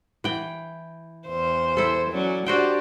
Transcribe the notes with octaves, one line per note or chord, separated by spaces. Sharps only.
E3 G5
E2 C5
E4 A4
F#3 C#4 D5
D4 F#4 G4 C5 D5 G5